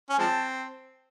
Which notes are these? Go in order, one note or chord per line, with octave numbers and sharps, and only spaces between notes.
C#4 G#5
F3 G#3 C4 A5